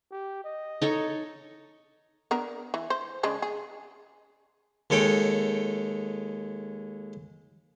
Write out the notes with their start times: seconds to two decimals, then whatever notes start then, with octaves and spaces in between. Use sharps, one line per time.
0.11 G4
0.44 D#5
0.82 D#4 A4 C#5
2.31 B3 D4 A#4
2.74 E3
2.90 C5
3.23 C#3 G#3 D4
3.42 G#4
4.90 D#2 G#3 A4 C#5 G5